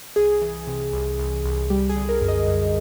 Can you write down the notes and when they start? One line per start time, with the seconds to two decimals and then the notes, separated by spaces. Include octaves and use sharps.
0.16 C2 G#4
0.42 E3
0.67 C3
0.93 C2
1.19 C2
1.44 C2
1.70 G3 G4
1.89 G#4
1.96 D3
2.09 A#4
2.21 F#2
2.28 D#5
2.48 F#2